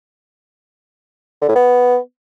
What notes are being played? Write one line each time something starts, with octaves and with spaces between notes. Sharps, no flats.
D3
A2
B3